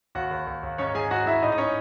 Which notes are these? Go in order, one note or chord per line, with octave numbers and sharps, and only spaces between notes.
D#2 F#4 F#5
D#2
D#2
D#2
G#2 C#4 C#5
G#2 G#4 G#5
G#2 F#4 F#5
G#2 E4 E5
A2 D#4 D#5
D#5
C#4 D#4 C#5